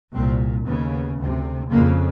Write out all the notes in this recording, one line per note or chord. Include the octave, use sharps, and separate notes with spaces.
C2 A#2 C4
D#2 C#3 B3
D2 C3
F2 C#3 A#3